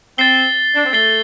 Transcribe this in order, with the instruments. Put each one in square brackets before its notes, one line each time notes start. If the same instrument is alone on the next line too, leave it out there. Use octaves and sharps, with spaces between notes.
[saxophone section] C4 [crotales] A6 C7 G7
[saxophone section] D4
C4
[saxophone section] A3 [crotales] A6 C7 G7